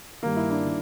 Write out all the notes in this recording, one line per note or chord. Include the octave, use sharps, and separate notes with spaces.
G2 D#3 G3 A#3
E4
D4
D#3 G3